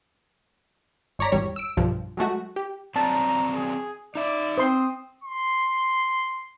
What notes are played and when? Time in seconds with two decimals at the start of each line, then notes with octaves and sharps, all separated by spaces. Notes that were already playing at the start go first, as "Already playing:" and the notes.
1.19 G1 C#5 D5 A#5 B6
1.32 G#1 E2 G3 C#5
1.56 E6 D7
1.77 B1 G2 F3
2.17 F#3 G#3 A3 F#4
2.56 G4
2.96 F#3 C4 D5 A5 A#5
3.54 G#4
4.15 D#4 D5 E5
4.58 C4 C5 C6 D#6
5.24 C6